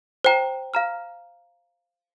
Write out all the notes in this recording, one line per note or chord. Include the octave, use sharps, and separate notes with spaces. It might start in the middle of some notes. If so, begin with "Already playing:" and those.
C5 G5 A#5
F5 A#5 F6